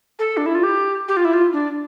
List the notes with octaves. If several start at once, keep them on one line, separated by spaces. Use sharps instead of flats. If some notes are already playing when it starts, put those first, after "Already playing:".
A4
D4
E4
F4
G4
G4
F4
E4
F4
D4